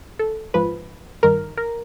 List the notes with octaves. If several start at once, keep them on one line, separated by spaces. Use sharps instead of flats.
A4
G#2 F3 B4
G2 D#3 A#4
A#4